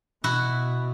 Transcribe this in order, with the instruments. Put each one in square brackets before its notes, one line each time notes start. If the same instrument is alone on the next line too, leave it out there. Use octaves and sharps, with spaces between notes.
[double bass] B2 [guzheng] E4 F#4